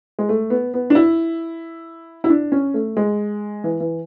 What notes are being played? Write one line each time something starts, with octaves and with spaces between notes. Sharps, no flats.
G#3
A3
B3
B3
D4
E4
E4
D4
C#4
A3
G#3
E3
E3